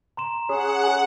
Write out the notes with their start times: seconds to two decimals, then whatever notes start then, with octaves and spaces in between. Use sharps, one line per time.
0.17 A#5 C6 E7
0.49 C#4 G#4 F#5